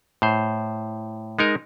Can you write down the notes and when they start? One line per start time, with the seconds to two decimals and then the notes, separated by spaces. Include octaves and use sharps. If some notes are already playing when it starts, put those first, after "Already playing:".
0.22 A2 C5
1.39 G#3 D#4 A#4